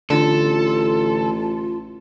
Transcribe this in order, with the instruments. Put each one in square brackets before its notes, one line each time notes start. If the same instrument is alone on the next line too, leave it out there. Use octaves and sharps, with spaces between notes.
[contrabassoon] A1 [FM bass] D3 [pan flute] F4 [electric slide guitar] A4